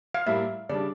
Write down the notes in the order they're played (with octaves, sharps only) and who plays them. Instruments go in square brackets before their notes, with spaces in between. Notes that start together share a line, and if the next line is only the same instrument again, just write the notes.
[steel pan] F5
[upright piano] A2 G3 A#3 E4 [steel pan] E5
[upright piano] C#3 G3 D4 [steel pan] D5